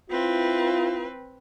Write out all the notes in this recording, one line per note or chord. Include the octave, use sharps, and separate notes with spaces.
C4 E4 F4 B4